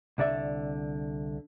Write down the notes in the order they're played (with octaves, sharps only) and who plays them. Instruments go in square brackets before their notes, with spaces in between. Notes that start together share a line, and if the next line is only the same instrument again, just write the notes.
[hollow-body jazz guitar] C2 D3 D5 E5